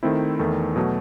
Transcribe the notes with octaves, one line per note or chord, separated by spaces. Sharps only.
D#3 A3 C4 E4
E2 D#3 A3
B2 F#3 A3